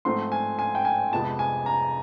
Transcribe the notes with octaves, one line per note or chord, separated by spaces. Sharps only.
G#2 F3 A3 C4 C6
G#5
G#5
G5
G#5
F2 C3 F3 G#3 B3 A5
G#5
A#5